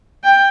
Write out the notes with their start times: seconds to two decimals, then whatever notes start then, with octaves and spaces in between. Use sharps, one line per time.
0.23 G5